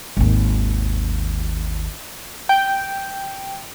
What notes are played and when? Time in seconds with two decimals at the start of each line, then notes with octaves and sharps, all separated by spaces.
0.17 G#1 D#2
2.49 G5